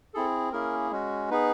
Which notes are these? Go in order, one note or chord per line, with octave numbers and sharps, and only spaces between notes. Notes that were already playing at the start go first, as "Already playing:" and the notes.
C4 E4 G#4 A4
A#3 C#4 E4 G#4 A#4
G#3 C#4 F#4
B3 D#4 G#4 B4